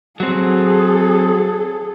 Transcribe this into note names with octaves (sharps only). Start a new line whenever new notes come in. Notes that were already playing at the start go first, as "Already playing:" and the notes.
F#3 C4 G#4 A4